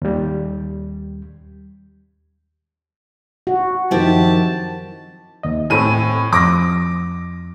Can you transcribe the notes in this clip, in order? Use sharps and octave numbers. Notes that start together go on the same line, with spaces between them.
D#2 G3
F#4
F#2 D#3 F3 C4 E4 G4 A5
D#2 D#5
A2 C4 A4 G#5 D#7
F2 D6 A#6